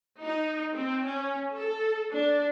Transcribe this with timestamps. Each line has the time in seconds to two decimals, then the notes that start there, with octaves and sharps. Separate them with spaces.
0.23 D#4
0.74 C4
1.05 C#4
1.54 A4
2.11 D4